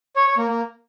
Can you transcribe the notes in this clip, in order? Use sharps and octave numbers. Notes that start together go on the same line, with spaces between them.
C#5
C#5
A#3
A#3